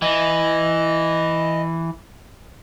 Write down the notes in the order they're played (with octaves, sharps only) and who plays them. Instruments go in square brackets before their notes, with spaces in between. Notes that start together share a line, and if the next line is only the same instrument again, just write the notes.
[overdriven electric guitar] E3 [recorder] D#5